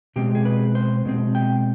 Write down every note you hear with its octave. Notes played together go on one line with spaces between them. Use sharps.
B2 G#3 C4 G4
G#4
B4
C5
B2 G#3 C4
G5